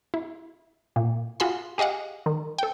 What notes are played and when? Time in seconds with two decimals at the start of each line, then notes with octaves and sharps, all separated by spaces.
0.14 E4
0.96 A#2
1.40 F4 F#4 G#4 B5 C6
1.78 G4 G#4 D#5 F5 F#5
2.26 D#3
2.58 A4 G5